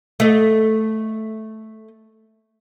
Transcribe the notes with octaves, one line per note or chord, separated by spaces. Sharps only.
A3 D#5